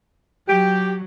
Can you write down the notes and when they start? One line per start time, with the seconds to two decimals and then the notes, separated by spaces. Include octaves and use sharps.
0.48 F#3 G4